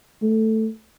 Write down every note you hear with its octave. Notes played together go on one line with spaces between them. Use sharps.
A3